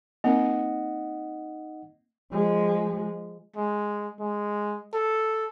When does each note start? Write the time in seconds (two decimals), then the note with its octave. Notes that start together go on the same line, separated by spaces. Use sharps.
0.24 A#3 C4 D#4 A#4 D#5 F#5
2.32 F3 G#3
3.56 G#3
4.19 G#3
4.93 A4